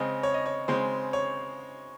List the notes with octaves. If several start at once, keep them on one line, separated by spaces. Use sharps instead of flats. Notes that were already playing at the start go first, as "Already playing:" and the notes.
Already playing: C#3 G#3 C4 D#5
C#5
D#5
C#5
C#3 G#3 C4 C5
C#5